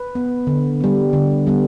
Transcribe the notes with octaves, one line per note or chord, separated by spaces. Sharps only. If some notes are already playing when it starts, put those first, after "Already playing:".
Already playing: B4
B3
D3
G3 B3
D3
G3 B3